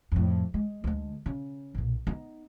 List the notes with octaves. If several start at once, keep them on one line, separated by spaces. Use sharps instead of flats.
F2 A2
G#3
D2 G#3
C#3
B1 A#2
B3 D#4